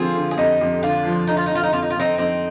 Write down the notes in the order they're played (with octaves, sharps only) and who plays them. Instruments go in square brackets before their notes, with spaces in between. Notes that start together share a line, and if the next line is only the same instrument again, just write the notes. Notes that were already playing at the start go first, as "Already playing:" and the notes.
Already playing: [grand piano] D3 F3 C4 [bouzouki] F4 G#4
[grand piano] D3
[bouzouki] G#4
[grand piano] F2 [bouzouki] D#4 G4
[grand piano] F2
[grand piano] D3 [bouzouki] D4 F4
[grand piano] F3
[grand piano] D3 [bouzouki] D#4
[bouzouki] F4
D#4
[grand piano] F3 [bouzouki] F4
[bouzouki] D#4
[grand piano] F2 [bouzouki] F4
[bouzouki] D#4
F4
[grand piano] F2 [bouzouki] C4 D#4
[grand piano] F2 [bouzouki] C4 D#4